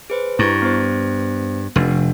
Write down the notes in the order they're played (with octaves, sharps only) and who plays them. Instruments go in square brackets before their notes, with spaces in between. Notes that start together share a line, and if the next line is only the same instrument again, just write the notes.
[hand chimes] G#4 B4 C5
[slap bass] G2 [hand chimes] E4 A#5 C#6
[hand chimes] B3 C5
[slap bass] F1 [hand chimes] D4